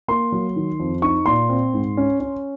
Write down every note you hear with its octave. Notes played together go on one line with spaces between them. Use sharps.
A#3 C6
F#3
D#3
F2
D#4 C#6
A#2 C6
C4
G#2
C#4
C#4